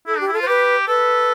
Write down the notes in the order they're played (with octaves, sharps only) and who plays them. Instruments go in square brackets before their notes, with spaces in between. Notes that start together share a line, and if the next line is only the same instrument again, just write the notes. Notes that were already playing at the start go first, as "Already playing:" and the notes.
[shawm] E4 [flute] A4
[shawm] D4 [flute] G4
[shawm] E4
[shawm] F4 [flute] A4
[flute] C5
[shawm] G4 [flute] B4
[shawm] A4 [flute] B4